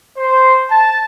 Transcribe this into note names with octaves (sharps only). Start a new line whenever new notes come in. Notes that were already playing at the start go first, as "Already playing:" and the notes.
C5
A5